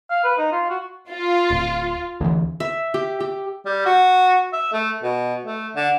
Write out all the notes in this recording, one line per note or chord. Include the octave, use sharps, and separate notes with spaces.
F5
B4
D#4
F4
F#4
F4
D1
D2 E3
E5
G4
G4
G3
F#4
E5
A3
B2
A3
D3